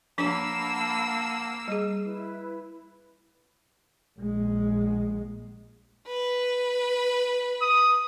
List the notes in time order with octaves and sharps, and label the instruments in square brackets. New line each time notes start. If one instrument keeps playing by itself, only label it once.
[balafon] F3 D4 [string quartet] A#3 E6 [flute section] F#5 A5 B5
[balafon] G3 G#4
[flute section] E4 B4
[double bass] A#1 G#3
[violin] B4
[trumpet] D#6